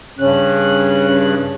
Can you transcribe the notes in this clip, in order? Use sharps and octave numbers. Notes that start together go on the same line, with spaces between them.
G2 C#3 C#4 F#6